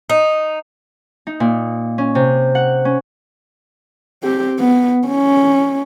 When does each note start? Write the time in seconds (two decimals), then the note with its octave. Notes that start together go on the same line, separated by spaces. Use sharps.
0.10 D#4
1.27 D#4
1.40 A#2
1.98 C#4
2.15 C3
2.55 F#5
2.85 C#4
4.23 C4 G4
4.59 B3
5.07 C#4